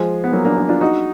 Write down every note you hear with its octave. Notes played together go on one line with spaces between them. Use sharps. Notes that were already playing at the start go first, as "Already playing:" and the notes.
Already playing: F3 G#3
B3
F#3 A#3
A#3 D4
A#3 D4
D4 F4
D#4 F#4